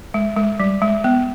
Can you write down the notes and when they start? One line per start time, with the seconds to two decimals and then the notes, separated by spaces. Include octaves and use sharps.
0.14 G#3
0.37 G#3
0.60 G3
0.82 G#3
1.04 B3